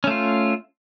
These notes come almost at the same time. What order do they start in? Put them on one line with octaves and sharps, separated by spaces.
C#4 A3 F4